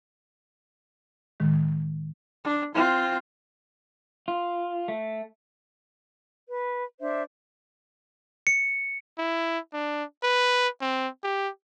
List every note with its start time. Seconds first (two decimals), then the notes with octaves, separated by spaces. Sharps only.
1.40 A2 D#3 G#3
2.44 D4
2.75 C4 F4
4.28 F4
4.88 A3
6.49 B4
7.00 D4 C5 E5
8.47 C#7
9.18 E4
9.74 D4
10.23 B4
10.81 C4
11.24 G4